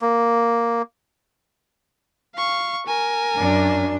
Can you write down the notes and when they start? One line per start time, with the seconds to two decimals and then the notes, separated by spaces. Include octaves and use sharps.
0.02 A#3
2.36 F5 C#6
2.87 A#4 G#5
3.37 F#2 D4